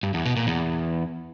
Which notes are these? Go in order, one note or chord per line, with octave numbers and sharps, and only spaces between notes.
G2
E2
B2
A#2
E2